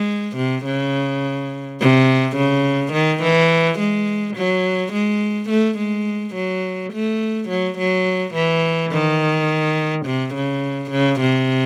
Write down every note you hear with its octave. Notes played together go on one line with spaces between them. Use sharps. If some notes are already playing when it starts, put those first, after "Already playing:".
Already playing: G#3
C3
C#3
C3
C#3
D#3
E3
G#3
F#3
G#3
A3
G#3
F#3
A3
F#3
F#3
E3
D#3
C3
C#3
C#3
C3